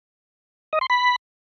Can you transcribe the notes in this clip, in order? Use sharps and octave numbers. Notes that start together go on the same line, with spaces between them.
D#5
C6
B5